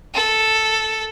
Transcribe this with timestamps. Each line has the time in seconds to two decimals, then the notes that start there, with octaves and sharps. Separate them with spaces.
0.15 A4